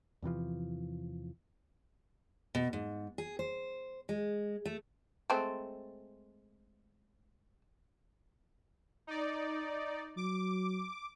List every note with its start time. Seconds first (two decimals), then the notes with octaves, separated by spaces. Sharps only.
0.22 E2 C3 E3 F3
2.55 B2
2.73 G#2
3.18 G#4
3.39 C5
4.09 G#3
4.66 A3
5.30 G#3 A3 C4
9.07 D#4 D5
10.17 F#3 D6